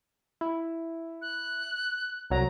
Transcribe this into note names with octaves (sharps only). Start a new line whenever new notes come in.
E4
F#6
C2 F#3 A#5